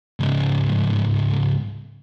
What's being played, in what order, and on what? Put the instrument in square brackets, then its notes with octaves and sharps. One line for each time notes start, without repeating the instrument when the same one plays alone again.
[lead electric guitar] C#2 G#2